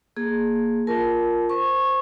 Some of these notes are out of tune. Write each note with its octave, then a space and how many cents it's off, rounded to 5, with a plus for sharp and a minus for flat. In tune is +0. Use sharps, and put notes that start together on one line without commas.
A#3 +0 G#4 +0
F4 +0 A#4 +0 A5 -20
C5 -5 C#6 -15